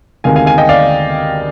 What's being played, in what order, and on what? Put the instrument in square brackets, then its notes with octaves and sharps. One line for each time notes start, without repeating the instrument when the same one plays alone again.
[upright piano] D2 C3 D#3 G#3 F5 G#5
F5 G#5
F5 G#5
D#5 G5
D5 F5